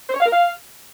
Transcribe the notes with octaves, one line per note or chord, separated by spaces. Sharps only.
C5
C#5
F5
A#4
F5